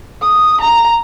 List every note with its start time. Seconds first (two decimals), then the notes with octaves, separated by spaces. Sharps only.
0.22 D#6
0.61 A#5